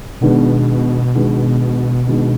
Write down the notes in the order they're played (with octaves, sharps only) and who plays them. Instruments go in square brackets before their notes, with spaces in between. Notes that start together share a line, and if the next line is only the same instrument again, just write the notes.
[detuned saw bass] B2 [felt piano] D#3 G#3 B3 D4
[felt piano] D#3 G#3 B3 D4
D#3 G#3 B3 D4